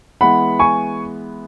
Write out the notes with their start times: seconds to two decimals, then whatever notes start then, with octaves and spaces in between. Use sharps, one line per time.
0.21 E3 G#3 B3 F#5 B5
0.59 G#5 C#6